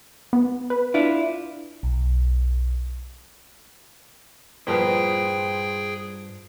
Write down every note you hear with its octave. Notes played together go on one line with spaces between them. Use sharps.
B3
B4
D4 E4 F4
B1
G2 A#2 F3 B3 G#4 C5 G5